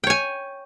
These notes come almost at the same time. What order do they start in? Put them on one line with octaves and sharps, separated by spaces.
G5 C#5 G#5